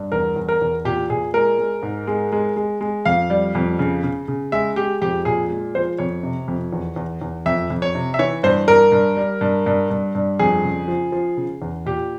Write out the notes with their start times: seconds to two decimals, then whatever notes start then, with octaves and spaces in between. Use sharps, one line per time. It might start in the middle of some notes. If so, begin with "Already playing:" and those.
Already playing: G2
0.12 E2 A#4
0.36 E2
0.49 A#4
0.61 E2
0.85 A#2 G4
1.10 A#2 G#4
1.34 G#3 A#4
1.59 G#3
1.83 G#2
2.07 G#3
2.32 G#3
2.56 G#3
2.81 G#3
3.05 F2 F5
3.30 G3
3.55 F2
3.79 C#3
4.03 C#3
4.28 C#3
4.52 G#3 E5
4.76 G#3 G4
5.02 F2 G4
5.25 A#2 G#4
5.50 G#3
5.75 F3 C5
5.98 F2 C#5
6.23 C3
6.48 F2
6.73 E2
6.96 E2
7.21 E2
7.46 F2 E5
7.70 F2
7.82 C#5
7.95 C3
8.14 E5
8.19 E3 C#5
8.43 G2 C5
8.68 G2 A#4
8.92 G2
9.17 G3
9.41 G2
9.66 G2
9.90 G2
10.15 G2
10.39 F2 G#4
10.64 C#3
10.88 F3
11.12 F3
11.37 C#3
11.62 E2
11.86 A#2 G4